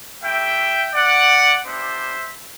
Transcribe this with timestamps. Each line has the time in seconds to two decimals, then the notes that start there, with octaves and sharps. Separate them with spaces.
0.23 A3 E4 G4 E5 G5
0.95 D5 F#5
1.66 G3 B3 D4 G4 C5 E5